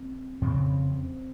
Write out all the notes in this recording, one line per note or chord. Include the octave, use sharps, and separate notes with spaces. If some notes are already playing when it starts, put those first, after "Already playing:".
Already playing: C4
F2 C#3 C4